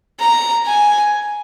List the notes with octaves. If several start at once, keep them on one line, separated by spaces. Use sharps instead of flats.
A#5
G#5